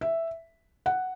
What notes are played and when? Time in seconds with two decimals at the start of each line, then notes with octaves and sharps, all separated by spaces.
0.01 E5
0.86 F#5